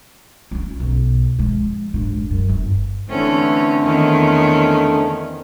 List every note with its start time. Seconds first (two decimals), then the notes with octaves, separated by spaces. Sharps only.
0.51 C4 C#4
0.80 B1
1.39 F3 G#3
1.94 G#2 D3
2.31 F#2
2.49 G1
3.09 D3 E3 A3 C4 C#4
3.82 E2 D#3 C#4